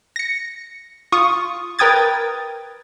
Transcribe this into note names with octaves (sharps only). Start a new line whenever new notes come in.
A#6 C#7
F4 C#6 D#6
A#4 B4 G5 D#6 G#6 A6